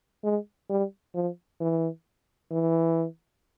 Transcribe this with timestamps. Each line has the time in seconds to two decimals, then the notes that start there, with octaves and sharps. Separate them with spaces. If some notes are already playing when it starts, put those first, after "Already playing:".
0.24 G#3
0.69 G3
1.15 F3
1.60 E3
2.51 E3